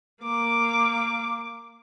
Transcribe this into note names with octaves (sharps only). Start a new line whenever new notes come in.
A#3 D6